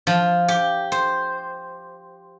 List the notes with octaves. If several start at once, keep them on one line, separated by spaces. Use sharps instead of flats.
F3
G4
C5